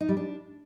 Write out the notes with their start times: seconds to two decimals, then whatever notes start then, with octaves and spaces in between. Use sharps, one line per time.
0.01 D#4
0.09 G3
0.17 D4